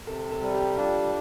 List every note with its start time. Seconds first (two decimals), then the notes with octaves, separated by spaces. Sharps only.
0.07 C3 A4
0.31 A4
0.42 G3
0.54 G4
0.77 D4 F4